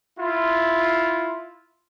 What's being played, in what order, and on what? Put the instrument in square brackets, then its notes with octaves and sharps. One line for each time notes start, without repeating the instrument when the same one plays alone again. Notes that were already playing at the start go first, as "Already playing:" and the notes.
[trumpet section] E4 F4